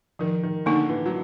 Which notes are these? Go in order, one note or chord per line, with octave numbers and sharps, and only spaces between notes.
D#3 F3
D#3
D3 A#3 D#4
E3
F#3